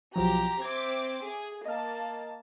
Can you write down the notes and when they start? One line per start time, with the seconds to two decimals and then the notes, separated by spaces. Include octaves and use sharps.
0.16 B1 F3 F#3 G4 A#5
0.62 C4 E5 D6 G#6
1.26 G#4
1.65 A#3 D#5 F5 A5